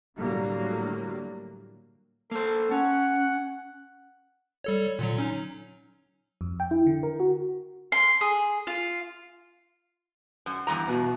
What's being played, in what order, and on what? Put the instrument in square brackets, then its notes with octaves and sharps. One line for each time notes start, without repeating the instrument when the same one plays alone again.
[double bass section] A2 D3 F#3 G3 A#3
[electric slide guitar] A#3 C5 [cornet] A4
[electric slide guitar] C#4 [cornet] F#5
[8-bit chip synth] G3 A4 C#5
A#2 D3 F#3
F#3 C#4 D#4
[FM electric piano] F2
G5
E4
D3
A#4
F#4
[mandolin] C6
G#4
F4
[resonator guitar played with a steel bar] F#2
E2 G2 A#5
[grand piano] B2